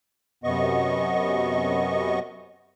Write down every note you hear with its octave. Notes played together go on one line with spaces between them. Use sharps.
F#2 C3 B3 D#5 C#6